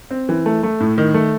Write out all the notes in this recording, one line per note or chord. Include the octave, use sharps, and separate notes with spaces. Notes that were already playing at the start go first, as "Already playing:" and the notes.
C4
E3
A3
A3
A2
D#3
A3